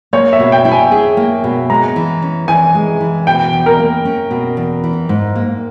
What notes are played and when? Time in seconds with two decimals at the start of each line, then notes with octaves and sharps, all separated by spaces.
0.13 A#3 C#5
0.33 E5
0.39 B2
0.52 G5
0.65 E4
0.72 G#5
0.91 G#4
1.17 A#3
1.44 B2
1.70 G#3 A#5
1.96 E3
2.22 C#4
2.48 E3 G#5
2.75 G#3
3.01 E3
3.27 B2 G5
3.53 E2
3.66 A#4
3.79 A#3
4.05 C#4
4.31 B2
4.57 E2
4.84 E3
5.09 G#2
5.35 A#3